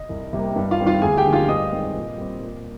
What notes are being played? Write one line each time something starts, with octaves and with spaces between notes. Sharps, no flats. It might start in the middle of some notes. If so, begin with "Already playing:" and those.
Already playing: D#5
C2
C3 G3 A#3
G2
F4 F5
D#3 G3 C4
F4 F5
D2 G#4 G#5
G4 G5
D3 F3 A#3
F4 F5
G2 D#5 D#6
D#3 G#3 C4
A#2
G3 C4
A#2